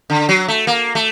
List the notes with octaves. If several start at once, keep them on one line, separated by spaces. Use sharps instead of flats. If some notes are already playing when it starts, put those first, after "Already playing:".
D3
F#3
A3
A#3
A3